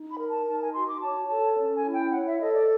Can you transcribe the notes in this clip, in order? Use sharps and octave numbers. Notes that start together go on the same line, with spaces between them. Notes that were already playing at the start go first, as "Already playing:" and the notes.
Already playing: D#4
B5
A#4
A5
D#4 A5
G#5
F#4 C6
D6
C#5 A5
A4 A5
C#4
G#5
E4
G5
C#5 F#5
E5
A4 D#5
D5